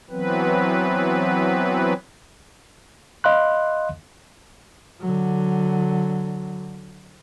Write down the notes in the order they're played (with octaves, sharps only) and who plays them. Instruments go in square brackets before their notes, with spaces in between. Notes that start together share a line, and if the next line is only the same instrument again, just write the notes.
[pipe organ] E3 F#3 B3 C4 B4
[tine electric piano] D#5 F5 B5 C6 F#6
[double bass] D3 F#3